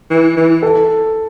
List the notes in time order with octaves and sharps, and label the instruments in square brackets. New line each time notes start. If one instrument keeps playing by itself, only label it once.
[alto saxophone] E3
E3
[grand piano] A4